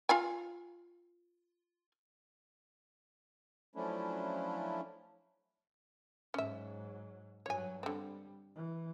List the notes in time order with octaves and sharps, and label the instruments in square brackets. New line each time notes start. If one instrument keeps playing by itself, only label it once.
[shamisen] F4 F5 G#5
[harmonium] F3 F#3 A3 C#4 D4 E4
[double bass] G#2 F#3 [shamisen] C#4 E5
[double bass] G2 F#3 [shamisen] C#5 G#5
[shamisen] D3 C4 [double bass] G3
[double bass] E3